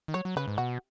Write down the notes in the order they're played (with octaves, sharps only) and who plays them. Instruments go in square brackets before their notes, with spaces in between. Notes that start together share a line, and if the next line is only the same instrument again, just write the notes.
[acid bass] D#3
[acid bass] F#3 [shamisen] C#5
[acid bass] F#3
[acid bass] C#3 [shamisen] B4
[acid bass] G#2
[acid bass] B2 [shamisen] F#4